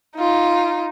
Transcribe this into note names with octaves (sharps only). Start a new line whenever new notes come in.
D#4 F4